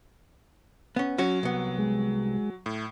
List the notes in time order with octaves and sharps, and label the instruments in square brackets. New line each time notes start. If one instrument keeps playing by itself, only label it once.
[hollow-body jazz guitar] B3 C#4
[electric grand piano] F#3 [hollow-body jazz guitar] C#4 F#4 C#5
[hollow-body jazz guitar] C2 B3
[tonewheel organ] G#3
[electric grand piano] A2